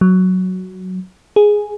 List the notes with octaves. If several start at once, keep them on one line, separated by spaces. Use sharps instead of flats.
F#3
G#4